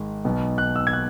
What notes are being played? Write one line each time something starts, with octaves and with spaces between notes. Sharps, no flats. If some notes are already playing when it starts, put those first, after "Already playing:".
Already playing: G#1 G#2 G#3
B1 B2 B3
F#6
E6
G#6
F#6